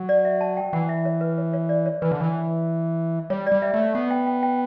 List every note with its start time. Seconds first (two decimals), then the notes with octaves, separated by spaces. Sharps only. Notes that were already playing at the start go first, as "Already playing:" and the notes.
Already playing: F#3
0.09 D5
0.25 E5
0.41 A5
0.57 G5
0.73 E3 F#5
0.89 E5
1.05 C#5
1.21 B4
1.38 C#5
1.53 C#5
1.69 D5
1.86 C#5
2.02 E3 B4
2.12 D3
2.20 E3
3.30 G3 C#5
3.47 D5
3.52 G3
3.62 E5
3.74 A3 E5
3.95 B3 F#5
4.11 G5
4.27 G5
4.43 G5